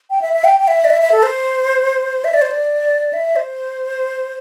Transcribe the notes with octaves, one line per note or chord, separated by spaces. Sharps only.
G5
E5
E5
G5
G5
E5
D5
E5
E5
A4
C5
E5
D5
C5
D5
E5
C5